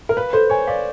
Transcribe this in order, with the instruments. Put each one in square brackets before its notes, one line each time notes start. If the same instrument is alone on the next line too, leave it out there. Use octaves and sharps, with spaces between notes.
[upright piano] A#4
[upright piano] B4 [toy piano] F5
[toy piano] A4 [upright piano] C5
[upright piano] C#5 [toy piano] G#5
[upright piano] D5 [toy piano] F5